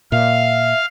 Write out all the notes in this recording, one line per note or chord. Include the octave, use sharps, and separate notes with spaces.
A#2 E5 F5